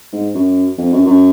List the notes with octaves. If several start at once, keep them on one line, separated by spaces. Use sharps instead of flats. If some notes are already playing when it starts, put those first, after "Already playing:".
G#2
F#2
F2
F#2
F#2